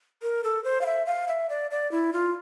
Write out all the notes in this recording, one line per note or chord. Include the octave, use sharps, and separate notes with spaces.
A#4
A4
C5
F5
E5
F5
E5
D5
D5
E4
F4